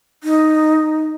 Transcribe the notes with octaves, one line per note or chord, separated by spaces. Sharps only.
D#4